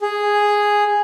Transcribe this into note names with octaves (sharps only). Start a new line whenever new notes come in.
G#4